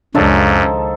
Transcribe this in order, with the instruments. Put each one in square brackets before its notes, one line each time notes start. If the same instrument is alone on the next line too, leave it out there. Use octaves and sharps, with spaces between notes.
[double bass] C#2 [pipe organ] F#2 [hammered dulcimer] D#3 F3 A4 [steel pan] C#4 D4 G#4